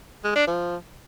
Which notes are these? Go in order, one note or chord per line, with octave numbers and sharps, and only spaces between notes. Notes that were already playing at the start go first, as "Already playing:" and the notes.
G#3
D4
F3